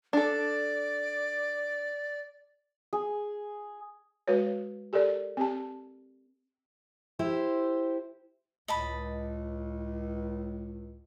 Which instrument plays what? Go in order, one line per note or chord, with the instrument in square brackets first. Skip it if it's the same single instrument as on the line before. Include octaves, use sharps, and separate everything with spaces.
[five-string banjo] D4 A4 [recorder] D5
[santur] G#4
[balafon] G#3 F#4 B4 C#5
G4 A4 A#4 D5
C4 G4 A5
[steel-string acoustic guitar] E4 G4 C5
[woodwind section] C#2 A2 [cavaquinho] D#5 A5 B5